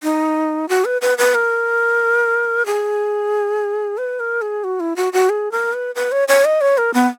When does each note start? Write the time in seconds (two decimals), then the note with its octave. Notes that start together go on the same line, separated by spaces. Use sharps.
0.03 D#4
0.69 F#4
0.85 B4
1.02 B4
1.18 B4
1.35 A#4
2.66 G#4
3.98 B4
4.20 A#4
4.42 G#4
4.64 F#4
4.80 E4
4.96 F#4
5.13 F#4
5.29 G#4
5.52 A#4
5.73 B4
5.95 B4
6.12 C#5
6.28 C#5
6.45 D#5
6.61 C#5
6.78 A#4
6.94 B3